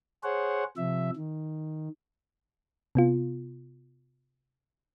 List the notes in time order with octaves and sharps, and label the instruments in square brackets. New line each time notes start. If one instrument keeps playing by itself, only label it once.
[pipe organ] G#4 C5 C#5 F#5
C3 F3 E5
D#3
[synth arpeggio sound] C3 B3 F4